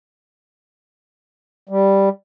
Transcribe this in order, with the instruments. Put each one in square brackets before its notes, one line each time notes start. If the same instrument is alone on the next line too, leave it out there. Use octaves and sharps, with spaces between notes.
[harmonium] G3